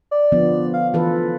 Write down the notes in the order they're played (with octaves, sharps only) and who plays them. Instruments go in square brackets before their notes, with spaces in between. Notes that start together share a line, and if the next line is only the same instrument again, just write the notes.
[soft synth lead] D5
[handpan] D3 F3 B3
[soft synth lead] F5
[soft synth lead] E3 [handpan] F4 A4 B4